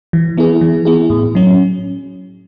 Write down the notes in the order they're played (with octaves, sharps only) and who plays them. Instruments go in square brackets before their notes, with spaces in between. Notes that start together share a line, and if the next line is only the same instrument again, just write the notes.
[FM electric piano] E3
B3 E4 G#4
E3
B3 E4 G#4
A2
F#3 C#4